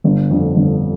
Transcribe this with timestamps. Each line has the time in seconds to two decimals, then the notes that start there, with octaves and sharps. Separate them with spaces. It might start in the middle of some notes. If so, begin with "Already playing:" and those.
0.04 G1
0.30 F2 D3
0.56 G1